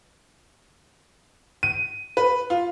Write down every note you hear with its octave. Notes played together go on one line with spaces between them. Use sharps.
D#7
B4
F4